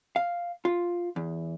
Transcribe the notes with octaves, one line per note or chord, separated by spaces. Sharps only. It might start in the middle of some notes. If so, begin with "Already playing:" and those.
F5
F4
E2